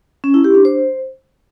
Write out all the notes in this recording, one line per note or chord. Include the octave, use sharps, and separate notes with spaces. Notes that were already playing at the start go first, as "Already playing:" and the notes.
C#4
E4
G4
D4
C5